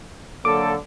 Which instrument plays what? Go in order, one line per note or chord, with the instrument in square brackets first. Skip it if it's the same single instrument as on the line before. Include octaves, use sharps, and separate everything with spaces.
[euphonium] D3 [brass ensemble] F#3 A#3 A4 [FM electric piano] D6